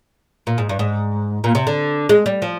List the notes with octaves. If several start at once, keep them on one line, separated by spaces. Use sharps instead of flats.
A#2
G#2
G2
G#2
A#2
C3
D3
G#3
G3
F3